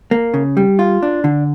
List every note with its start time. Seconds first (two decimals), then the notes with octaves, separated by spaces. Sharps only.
0.11 A#3
0.34 C#3
0.57 G3
0.79 F4
1.03 D4
1.24 D3